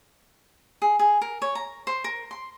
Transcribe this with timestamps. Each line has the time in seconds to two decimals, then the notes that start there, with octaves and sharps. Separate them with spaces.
0.82 G#4
0.99 G#4
1.21 A#4
1.42 C#5
1.55 A#5
1.87 C5
2.04 A#4
2.31 C6